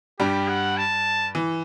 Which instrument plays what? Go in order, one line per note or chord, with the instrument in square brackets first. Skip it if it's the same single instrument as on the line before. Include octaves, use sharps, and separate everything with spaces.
[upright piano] G2 G3 [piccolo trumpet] G4
[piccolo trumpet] F#5
A5
[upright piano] E3